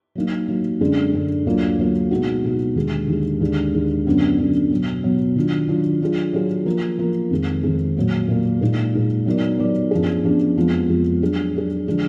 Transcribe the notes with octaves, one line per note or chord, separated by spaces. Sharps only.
F#3 A#3 D#4
F#3 A#3 D#4
F#2 D3 G#3
F#2 D3 G#3
D2 D3 F#3 A#3 F4
D2 D3 F#3 A#3 F4
B2 G#3 D#4 F#4
B2 G#3 D#4 F#4
D#2 D3 G#3
D#2 D3 G#3
D#2 D3 G#3
D#2 D3 G#3
F#2 D3 F#3 B3 D4
F#2 D3 F#3 B3 D4
B2 F#3 B3
B2 F#3 B3
D#3 F#3 D4 F4
D#3 F#3 D4 F4
F#3 D4 F4 G#4
F#3 D4 F4 G#4
F3 A#3 F4 A#4
F3 A#3 F4 A#4
F2 D#3 G#3
F2 D#3 G#3
A#2 F#3 A#3
A#2 F#3 A#3
A#2 G#3 D#4
A#2 G#3 D#4
F#3 B3 D#4 A#4 D5
F#3 B3 D#4 A#4 D5
F#2 F3 B3 D4 G#4
F#2 F3 B3 D4 G#4
F2 F3 G#3 B3 F4
F2 F3 G#3 B3 F4
F#3 D4 G#4
F#3 D4 G#4
D3 F3 G#3 D4